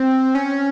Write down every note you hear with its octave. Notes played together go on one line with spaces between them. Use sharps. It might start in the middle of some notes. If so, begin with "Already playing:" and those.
Already playing: C4
C#4